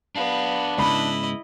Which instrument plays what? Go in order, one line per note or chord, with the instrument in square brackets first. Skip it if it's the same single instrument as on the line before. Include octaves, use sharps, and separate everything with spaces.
[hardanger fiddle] B3 [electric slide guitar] D4 F5
[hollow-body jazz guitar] G#2 C#3 B3 [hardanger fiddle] E4 D#5 [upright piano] B5